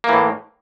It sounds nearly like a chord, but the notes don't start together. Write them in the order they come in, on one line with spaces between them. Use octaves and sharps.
A#3 E3 A2